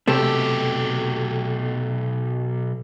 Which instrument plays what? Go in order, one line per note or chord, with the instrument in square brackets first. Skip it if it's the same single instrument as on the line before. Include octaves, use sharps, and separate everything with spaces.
[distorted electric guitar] B1 G4 [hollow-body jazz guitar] C3 A3